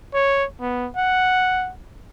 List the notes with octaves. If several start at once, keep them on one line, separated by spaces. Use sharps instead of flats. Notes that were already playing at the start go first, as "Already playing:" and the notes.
C#5
B3
F#5